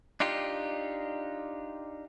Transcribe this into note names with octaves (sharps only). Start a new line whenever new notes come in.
D4 D#4 F4 G4